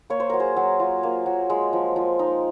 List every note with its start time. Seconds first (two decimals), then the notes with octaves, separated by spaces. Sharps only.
0.10 A#3 C#5
0.20 C5
0.30 F#3 A#4
0.40 G#4 C5
0.56 F#3
0.80 F4
1.03 A#3
1.26 F#3
1.50 G#3
1.73 F3
1.96 F3
2.19 D#4